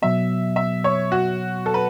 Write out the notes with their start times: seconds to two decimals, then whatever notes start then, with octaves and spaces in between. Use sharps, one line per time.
0.02 B2 F#3 B3 E5
0.56 E5
0.84 C#5
1.12 F#4
1.66 A4
1.74 B4